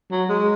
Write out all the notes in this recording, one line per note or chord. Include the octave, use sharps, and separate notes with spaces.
F#3
G#3